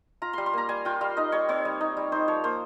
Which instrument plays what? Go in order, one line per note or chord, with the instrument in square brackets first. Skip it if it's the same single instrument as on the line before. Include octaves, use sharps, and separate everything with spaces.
[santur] F4 A#5
G3 C6
C6
A#3 A#5
G3 G#5
F4 G5
G3 F5
D#4 D#5
G3 C#5
C4 C#5
G3
D#4
G3
D#4 C5
F3 C#5
A#3 C5